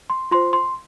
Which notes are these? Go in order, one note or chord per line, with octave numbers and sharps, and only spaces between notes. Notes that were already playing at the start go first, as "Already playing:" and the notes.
C6
F4 C5 C6
C6